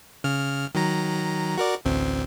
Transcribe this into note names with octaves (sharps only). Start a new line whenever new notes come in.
C#3 F6
D#3 F#3 A#5
F#4 A#4 D5
A1 D2 C4